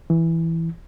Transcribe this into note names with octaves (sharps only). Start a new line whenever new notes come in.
E3